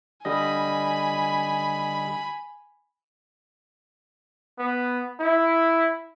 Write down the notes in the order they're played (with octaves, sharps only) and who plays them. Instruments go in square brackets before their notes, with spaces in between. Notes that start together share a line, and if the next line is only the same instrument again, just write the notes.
[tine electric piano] D3 G3 D#5 [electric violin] G#5 B5
[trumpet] B3
E4